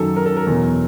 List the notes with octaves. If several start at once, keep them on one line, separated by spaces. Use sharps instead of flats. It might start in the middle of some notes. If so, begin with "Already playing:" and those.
Already playing: F#2 D#3 F#3 A4
A#4
A4
A#4
E2 B2 F#3